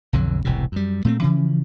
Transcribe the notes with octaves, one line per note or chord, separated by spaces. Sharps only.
B1 F2 D3 F#3
E1 C2 A2 C3
F#2 G3
A#2 A3 B3 C4
C#3 E3 F3 C#4